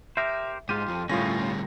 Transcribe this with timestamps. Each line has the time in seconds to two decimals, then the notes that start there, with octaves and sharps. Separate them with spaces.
0.17 G4 A#4 C5 E5
0.69 G#2 F4 G4 D#7
0.88 F2
1.10 D2 A2 G3 C#4 F4 A#6